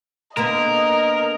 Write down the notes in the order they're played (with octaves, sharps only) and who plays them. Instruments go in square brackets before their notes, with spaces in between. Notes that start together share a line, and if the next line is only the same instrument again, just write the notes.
[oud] D3 A#3 B3 [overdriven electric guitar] A#4 [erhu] D#5